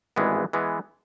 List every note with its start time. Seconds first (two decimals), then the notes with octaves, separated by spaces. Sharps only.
0.16 G#1 G2 E3 G#3 B3
0.53 E3 G#3 B3